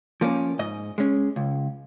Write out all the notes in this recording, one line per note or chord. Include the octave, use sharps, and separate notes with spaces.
F3 A#3 C#4
G#2 D#5
G#3 C#4
C#2